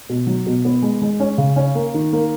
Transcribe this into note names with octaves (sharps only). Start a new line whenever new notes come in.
B2
F#3
B2
B3
G#3
G#3
C#4
C#3
C#4
A#3
D#3
A#3